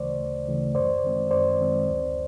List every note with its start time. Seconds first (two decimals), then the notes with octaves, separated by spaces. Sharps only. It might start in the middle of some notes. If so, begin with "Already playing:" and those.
Already playing: D2 C#3 E3 A3 C5 D5
0.20 D2
0.48 C#3 E3 A3
0.75 F#2 C5 D5
1.04 D#3 G#3 C4
1.31 F#2 C5 D5
1.60 D#3 G#3 C4
1.87 D2